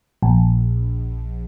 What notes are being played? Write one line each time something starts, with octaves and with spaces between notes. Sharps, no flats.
A#1